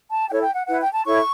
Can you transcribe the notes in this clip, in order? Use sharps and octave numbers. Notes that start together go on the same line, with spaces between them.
A5
E4 A4 C#5 G5
G5
F#5
E4 B4 F#5
G5
A5
E4 A4 C#5 C#6